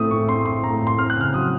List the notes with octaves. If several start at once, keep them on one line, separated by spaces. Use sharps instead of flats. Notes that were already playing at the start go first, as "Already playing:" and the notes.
Already playing: A2 A3 C4 D#6
A2 C#6
C4 C6
A2 C6
A3 A#5
A2
C6
C4 F6
F#6
C#3 F6
F#3 D#6